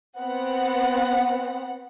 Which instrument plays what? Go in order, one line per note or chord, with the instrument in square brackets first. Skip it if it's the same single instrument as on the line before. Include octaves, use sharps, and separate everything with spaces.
[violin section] B3 C4 F#5